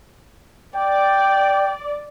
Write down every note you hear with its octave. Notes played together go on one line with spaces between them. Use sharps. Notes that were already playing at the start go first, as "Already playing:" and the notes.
D5 G5